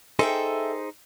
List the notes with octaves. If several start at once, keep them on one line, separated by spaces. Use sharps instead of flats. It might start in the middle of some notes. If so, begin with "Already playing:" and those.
D#4 G#4 A4 C5 E5 G5